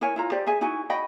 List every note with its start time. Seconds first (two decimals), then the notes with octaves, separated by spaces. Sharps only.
0.01 E4 A#4 C#5 G#5
0.16 E4 F4 A#5
0.32 G4 C5 D5
0.47 G#4 E5 G#5
0.61 D#4 E4 F#4 G#5
0.90 F#4 D#5 G5 B5